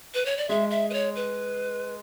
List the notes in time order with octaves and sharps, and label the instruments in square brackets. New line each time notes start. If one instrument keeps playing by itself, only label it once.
[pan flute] B4
C#5
D5
[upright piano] G#3 [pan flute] E5
[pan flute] E5
B4
C#5
B4